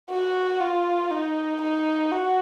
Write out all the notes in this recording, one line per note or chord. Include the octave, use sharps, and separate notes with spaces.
F#4
F4
D#4
D#4
F#4